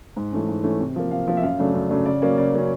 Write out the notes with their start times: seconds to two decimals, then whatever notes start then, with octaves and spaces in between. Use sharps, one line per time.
0.16 G#2
0.32 E3 A3 C#4
0.48 G#2
0.64 E3 A3 C#4
0.80 C3
0.96 F3 A#3
1.11 C3 F5
1.28 F3 A#3
1.37 E5
1.43 F#2 F5
1.58 C#3 F#3 A3 D4
1.74 F#2
1.90 C#3 F#3 A3 D4
2.06 C#3 D5
2.22 F#3 A#3 C#4 D5
2.38 C#3 D5
2.54 F#3 A#3 C#4